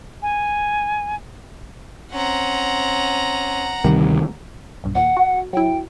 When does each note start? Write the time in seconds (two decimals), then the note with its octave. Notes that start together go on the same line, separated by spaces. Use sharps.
0.22 G#5
2.13 C4 C#4 F#5 A#5
3.84 D2 C3 D#3 G3
4.84 B1 G2
4.95 D#2 A#2 F#5
5.17 F#4
5.53 F#3 E4 G5